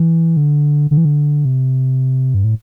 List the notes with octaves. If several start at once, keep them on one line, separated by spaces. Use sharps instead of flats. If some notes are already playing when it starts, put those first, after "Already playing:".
Already playing: E3
D3
D3
E3
D3
C3
G2
A2